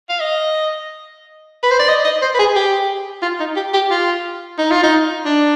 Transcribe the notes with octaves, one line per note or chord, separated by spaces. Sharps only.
F5
D#5
B4
C5
D5
D#5
D#5
C5
B4
G#4
G4
F4
D#4
G4
G4
F4
D#4
F4
D#4
D4